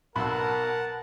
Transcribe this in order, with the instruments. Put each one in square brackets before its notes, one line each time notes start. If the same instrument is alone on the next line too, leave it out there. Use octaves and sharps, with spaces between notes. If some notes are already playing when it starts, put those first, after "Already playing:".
[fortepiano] B1 B2 E6 [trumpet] A#4 [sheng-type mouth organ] F#5 A5 [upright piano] B5